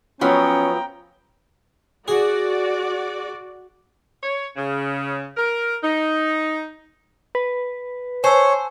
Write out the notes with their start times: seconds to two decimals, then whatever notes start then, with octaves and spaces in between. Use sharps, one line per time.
0.21 F3 F#3 B3 C#4 C#5 G5 A#5
2.08 F#4 G#4 D5
4.23 C#5
4.56 C#3
5.37 A#4
5.83 D#4
7.35 B4
8.24 C5 C#5 G#5 A5 E6